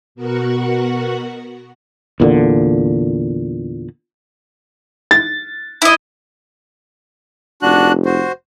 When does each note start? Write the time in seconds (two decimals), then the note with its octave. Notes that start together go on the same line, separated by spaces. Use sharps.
0.15 B2 B3 F#4 A#4 F#5 C#6
2.20 E2 A#2 D3
5.11 A6
5.82 E4 D#5
7.62 F1 D4 F#4 F#6
8.05 F#4 C5